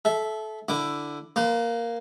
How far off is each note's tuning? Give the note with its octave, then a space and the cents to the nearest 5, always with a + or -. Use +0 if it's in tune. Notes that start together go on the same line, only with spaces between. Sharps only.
A4 -25 E5 +0
D3 +0 E4 +10 D6 +0
A#3 +0 B4 +40